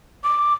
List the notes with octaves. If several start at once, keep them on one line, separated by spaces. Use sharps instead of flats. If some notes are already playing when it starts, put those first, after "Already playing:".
D6